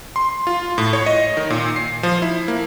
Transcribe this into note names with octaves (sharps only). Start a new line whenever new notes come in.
C6
F4
A2
C#5
D#5
D#3
A#2
C7
F3
E4
A#3